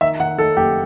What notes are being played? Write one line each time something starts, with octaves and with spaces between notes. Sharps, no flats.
D#3 E5
D#3 F#5
D#3 A4
F#1 G4